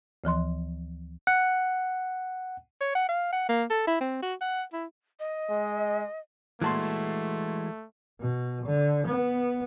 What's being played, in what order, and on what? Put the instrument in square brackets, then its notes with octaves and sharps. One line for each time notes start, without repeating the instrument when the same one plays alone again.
[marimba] D2 E3 F3 C6
[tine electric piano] F#5
[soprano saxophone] C#5
F#5
F5
F#5
A#3
A4
E4
C4
F#4
F#5
E4
[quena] D#5
[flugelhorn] G#3
[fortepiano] A#2 A5 C6 [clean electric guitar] E3 G#3 F#4 [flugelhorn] A3
[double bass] B2
D3
B3